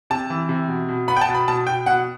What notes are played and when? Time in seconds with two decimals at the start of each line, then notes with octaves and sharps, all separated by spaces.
0.10 C3 A5
0.30 E3
0.49 C3
0.68 B2
0.89 B2
1.08 B3 B5
1.16 G5
1.21 A5
1.28 B2
1.35 B5
1.48 B2 A5
1.67 B2 G5
1.86 B2 F#5